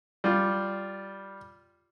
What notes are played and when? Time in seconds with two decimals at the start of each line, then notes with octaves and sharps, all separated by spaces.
0.24 G3 F4